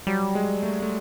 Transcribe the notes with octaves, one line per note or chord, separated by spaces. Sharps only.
F#3 G3
G#3
A3
A3